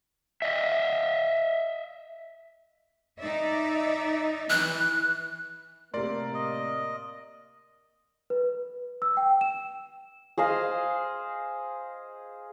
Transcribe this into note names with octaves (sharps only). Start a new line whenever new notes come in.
D#5 E5
D#4 D5 E5
E3 F#6
A2 C3 A#3 A#4 D5 C6
D#5
B4
E6
G5
E7
G#4 C5 D#5 F5